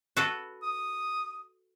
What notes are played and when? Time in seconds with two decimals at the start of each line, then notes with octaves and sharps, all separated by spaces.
0.17 F#4 A4 B4
0.63 D#6